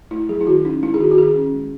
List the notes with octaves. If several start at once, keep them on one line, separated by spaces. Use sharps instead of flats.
A3 E4
F#3 G#4
E4
D#3 F#4
C#4 D#4
G#3 E4
G#4
D#3 F#4
F#4
D#3 G#4
C#4
G#3